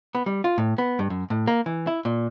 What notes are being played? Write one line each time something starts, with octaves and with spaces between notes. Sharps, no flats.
B3
G3
F4
A2
B3
G2
F#2
A2
A#3
E3
E4
A#2